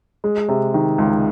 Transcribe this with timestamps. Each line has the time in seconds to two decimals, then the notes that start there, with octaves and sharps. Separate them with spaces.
0.24 G#3
0.49 C3
0.74 D#3
0.98 C#2